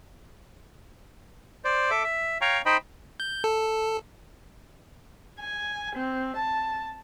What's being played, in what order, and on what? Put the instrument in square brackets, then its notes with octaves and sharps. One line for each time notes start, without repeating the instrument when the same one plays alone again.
[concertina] C5 D5
A4 E5 D6
E5
C#5 F5 G5 A#5 C#6
D#4 C5 D#5 G5 B5
[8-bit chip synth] G6
A4
[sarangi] G#5
C4
A5